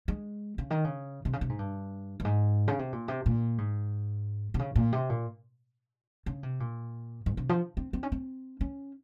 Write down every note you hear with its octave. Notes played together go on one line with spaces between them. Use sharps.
G#3
C#3
D#3
C#3
C3
C#3
C3
G#2
G2
G2
G#2
C#3
C3
A#2
C3
A#2
G#2
C3
C#3
A#2
C3
A#2
C#3
C3
A#2
G#2
C3
F3
C4
C4
C#4
C4
C#4